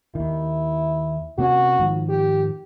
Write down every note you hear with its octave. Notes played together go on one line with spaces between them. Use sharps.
D#2 D#3 E4
C3 A#3 C#4 F#4
G#2 D#3 F3
G4